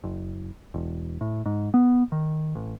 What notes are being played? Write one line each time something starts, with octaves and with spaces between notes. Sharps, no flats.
F#1
E1
A2
G#2
B3
D#3
A1